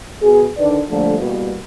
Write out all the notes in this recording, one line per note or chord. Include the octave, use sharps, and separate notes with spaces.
B2 G#4
D3 D#3 D4 B4 D5
A#2 D3 F3 G3 A3 A#3
E2 B2 E3 G3 A#3 G4